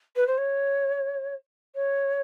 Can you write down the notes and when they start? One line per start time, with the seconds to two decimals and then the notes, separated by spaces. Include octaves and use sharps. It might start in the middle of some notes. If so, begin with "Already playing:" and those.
0.16 B4
0.27 C5
0.38 C#5
1.75 C#5